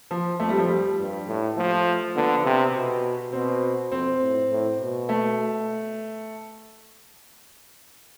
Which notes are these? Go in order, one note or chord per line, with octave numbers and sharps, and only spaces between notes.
F3
F2 A3
G3
F3
G3
G2
A2
F3 A3
D3 B3
C3
B2
B2 C4
F2 C4
A2
A2
B2
A3